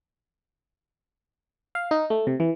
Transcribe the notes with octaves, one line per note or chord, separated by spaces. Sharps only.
F5
D#4
A3
C3
E3